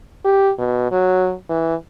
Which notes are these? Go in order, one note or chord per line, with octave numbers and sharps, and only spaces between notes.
G4
B2
F#3
E3